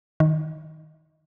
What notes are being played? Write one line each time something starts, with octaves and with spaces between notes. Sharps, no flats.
D#3